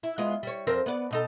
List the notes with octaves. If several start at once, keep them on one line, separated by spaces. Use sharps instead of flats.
E4
G#3 B3 F4
G3 C#5
F2 C4 A#4
B3 D5
B2 D#4 A4